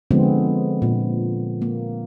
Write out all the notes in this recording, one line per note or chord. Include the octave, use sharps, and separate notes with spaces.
D3 F3 G#3 B3 C4
A#2
A#3